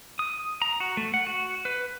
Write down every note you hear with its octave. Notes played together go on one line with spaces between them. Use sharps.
D#6
A#5
F#4
A3
F#5
F#4
B4